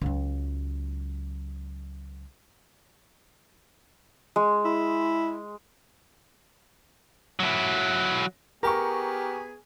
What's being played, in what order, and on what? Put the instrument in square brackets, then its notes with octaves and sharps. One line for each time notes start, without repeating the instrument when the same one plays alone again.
[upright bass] C#2 F#3
[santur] G#3
[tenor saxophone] E4
[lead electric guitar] F#3 E4
[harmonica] B3 G#4 G#5 [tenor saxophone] G4 [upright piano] A#4 [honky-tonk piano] A#5 C#6